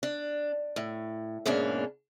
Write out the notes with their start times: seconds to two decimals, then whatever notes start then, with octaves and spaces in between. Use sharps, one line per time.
0.03 D4
0.76 A2
1.46 E2 G#2 B2 A#3 C#4 D4